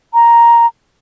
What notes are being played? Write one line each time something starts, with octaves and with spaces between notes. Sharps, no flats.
A#5